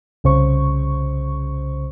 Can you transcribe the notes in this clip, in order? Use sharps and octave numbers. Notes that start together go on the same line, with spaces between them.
C2 C#3 C5 C#6